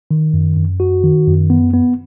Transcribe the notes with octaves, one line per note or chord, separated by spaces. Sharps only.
D#3
F#2
F#2
F#4
D#3
F#2
B3
B3